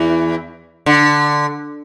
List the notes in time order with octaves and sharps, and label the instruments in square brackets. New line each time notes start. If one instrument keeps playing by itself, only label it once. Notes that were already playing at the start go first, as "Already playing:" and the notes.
Already playing: [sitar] E2 E3
D3